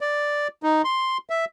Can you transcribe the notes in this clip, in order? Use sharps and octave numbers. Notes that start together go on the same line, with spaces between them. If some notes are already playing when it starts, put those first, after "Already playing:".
D5
D#4
C6
E5